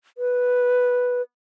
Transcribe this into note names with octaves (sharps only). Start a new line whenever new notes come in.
B4